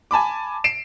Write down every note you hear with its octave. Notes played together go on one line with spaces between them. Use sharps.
G#5 A5 B5 D6
C7 D7 E7